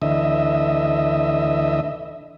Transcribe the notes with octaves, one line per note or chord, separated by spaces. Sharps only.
D2 D3 E3 D#5 E5